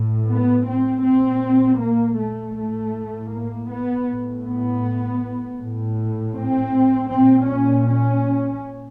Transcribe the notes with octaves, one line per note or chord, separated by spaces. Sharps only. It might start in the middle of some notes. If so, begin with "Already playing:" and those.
Already playing: A2
B3
C4
A#2 C4
A#3
A3
A2 A3
A#3
B3
A2
B3
A2
C4
A#2 C4
C#4
C#4